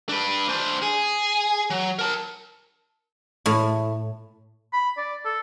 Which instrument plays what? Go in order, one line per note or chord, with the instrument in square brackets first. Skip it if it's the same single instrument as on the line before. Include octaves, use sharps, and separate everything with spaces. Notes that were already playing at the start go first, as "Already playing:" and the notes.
[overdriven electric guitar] D4 B4
D4 C5
G#4
F#3
A#4 A5
[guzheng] A2
[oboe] B5
D5
A4